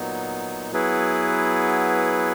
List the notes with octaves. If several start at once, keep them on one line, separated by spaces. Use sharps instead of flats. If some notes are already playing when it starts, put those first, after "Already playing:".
Already playing: A#2 F#3 B3 D#4
F#3 B3 E4 G#4 B4